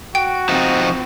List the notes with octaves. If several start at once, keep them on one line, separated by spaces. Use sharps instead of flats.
F#4 G5
F3 C4 D#4